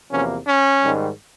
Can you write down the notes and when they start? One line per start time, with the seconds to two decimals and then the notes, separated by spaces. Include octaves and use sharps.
0.11 E2 C3 F3 A#3 C#4
0.47 C#4
0.83 G#2 D#3 G3